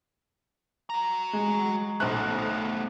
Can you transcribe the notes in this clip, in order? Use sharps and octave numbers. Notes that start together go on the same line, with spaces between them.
F#4 A#5
G#3
B1 A3 B3 C5 F#6